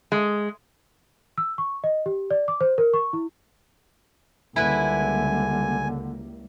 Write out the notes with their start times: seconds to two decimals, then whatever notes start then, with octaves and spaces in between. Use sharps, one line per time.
0.12 G#3
1.38 E6
1.58 C#6
1.84 D#5
2.06 G4
2.31 D5
2.48 D6
2.61 C5
2.78 A#4
2.94 C#6
3.13 E4
4.56 C#2 D3 G3 A#3 E4 B4 G#5